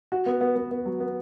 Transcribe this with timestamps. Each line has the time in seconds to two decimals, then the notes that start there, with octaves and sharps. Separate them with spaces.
0.12 F#4
0.26 B3
0.41 B3
0.56 B3
0.71 B3
0.86 F#3
1.00 B3